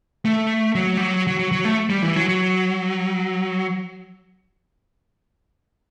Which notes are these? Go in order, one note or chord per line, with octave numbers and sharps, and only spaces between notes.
A3
F#3
G3
F#3
F#3
F#3
F#3
A3
G3
E3
F#3
F#3